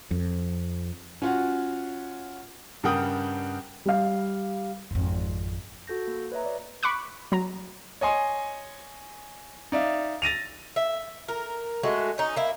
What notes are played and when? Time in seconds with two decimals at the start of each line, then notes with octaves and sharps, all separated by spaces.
0.11 F2
1.22 C#4 F4 F#4
2.83 G2 C#3 A#4 F#5 G5 D#6
3.86 G3 F5
4.91 G#1 F2
5.87 F#4 A4 G6 A#6
6.07 A#3
6.32 B4 C#5 D#5 E5 A#5
6.45 D5
6.83 B5 C#6 D6 F#6
7.32 F#3 A#5
8.01 C#5 D#5 G#5 C6
9.72 D#4 D5 E5 F5
10.22 A6 A#6 D#7 F7
10.76 E5
11.28 A#4
11.83 G#3 A3 F#4
12.18 C#4 D#4
12.36 A#3 E4